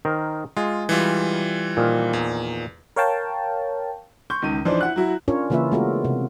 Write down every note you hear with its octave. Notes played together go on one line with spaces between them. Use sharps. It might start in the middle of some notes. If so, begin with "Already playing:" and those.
D#3 A#4 C5
G#3 F4
E3 G3 F4
A#2 D#3 F3
E2
A#4 C#5 F5 G5 A5
C6 C#6 G6
C#2 D#3 D#7
E3 F3 D4 D#4 C5 D5
E4 F#5 F#6
F#3 E4 F#4
C#4 D4 F4 A#4 C#5
C#3 E3 A#3 F4 B4 E5
G#3 A3 B3 F4 F#4 A#4
C3